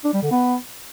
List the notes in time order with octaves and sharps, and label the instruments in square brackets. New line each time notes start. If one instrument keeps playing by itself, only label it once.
[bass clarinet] D4
G3
D3
B3